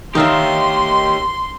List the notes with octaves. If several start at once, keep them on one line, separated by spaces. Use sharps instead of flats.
D#3 D#4 F4 G4 C#5 E5 C6